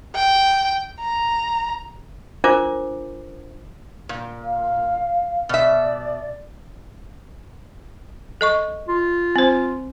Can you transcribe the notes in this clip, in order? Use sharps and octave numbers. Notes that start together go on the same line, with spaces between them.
G5
A#5
D4 F4 A#4 C5 D6
A#2
F5
B2 D5 E5
A4 D#5 C#6
F4
C4 C5